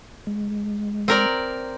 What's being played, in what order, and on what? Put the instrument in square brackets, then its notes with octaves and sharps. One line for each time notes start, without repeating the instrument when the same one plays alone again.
[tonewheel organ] G#3
[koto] C4 A#4 D5